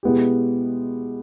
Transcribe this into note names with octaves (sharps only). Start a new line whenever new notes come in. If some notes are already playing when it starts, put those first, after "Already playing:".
B2 G#3 B3 E4 G4